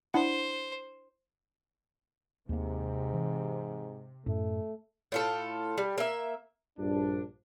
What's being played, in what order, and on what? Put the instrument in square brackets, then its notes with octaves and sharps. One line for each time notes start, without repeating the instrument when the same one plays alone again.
[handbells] D4 E4 F#5 [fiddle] C5
[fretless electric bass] D#2 A#3 [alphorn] G#2 [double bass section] C3
[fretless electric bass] E3
[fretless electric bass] F#2 A2 [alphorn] A3
[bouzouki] A2 F4 A4
G3
A#3 E5
[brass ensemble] A#1 G2 D4